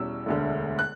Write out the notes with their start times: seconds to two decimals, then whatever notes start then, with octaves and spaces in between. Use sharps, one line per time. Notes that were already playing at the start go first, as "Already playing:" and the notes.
Already playing: E2 B2 G3 C#4 E6
0.26 E1 D2 D3
0.79 F#6